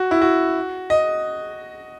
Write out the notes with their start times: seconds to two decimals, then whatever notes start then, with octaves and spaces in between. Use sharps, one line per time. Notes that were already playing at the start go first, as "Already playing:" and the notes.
Already playing: F#4
0.11 E4
0.22 F#4
0.90 D#5